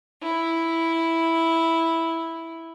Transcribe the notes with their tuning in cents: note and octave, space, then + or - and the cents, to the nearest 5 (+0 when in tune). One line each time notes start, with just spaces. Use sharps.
E4 -5